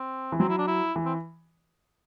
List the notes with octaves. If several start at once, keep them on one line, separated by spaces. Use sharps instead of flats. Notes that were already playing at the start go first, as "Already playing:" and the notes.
Already playing: C4
E3
F#3 C4
E4
D4
E4
E3
C4